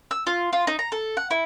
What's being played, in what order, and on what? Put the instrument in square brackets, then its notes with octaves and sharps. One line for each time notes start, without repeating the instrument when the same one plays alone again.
[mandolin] E6
F4
F4
D#4
A#5
A4
F#5
E4